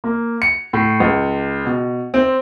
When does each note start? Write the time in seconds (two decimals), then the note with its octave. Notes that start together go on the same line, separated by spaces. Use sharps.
0.04 A#3
0.42 C#7
0.73 A2
1.00 C#2
1.65 B2
2.14 C4